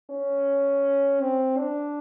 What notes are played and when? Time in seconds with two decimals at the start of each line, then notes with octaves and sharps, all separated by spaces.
0.10 C#4
1.21 C4
1.57 D4